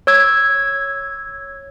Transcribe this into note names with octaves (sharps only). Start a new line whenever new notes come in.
C#5 E6 G#6